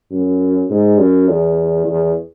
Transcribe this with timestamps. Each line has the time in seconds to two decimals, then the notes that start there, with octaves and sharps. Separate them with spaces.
0.12 F#2
0.70 G#2
0.99 F#2
1.29 E2
1.86 E2